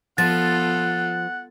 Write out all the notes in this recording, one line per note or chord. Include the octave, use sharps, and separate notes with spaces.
F3 B3 F4 A4 F#5 A6